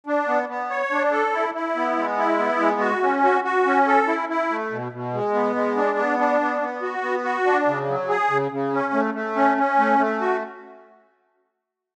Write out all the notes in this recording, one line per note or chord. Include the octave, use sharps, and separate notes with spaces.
D4
B3
B3
C#5
D4
A4
E4
E4
B3
G#3
E4
B3
G#3
F#4
C#4
F#4
F#4
C#4
A4
E4
E4
A3
B2
B2
G#3
B3
G#3
D4
B3
D4
B3
B3
F#4
B3
F#4
D4
C#3
F#3
G#4
C#3
C#3
C#4
A3
A3
C#4
C#4
A3
A3
F#4